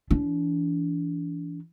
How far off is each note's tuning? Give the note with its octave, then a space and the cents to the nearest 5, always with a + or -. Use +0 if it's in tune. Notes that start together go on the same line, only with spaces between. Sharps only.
E3 +10 D4 -35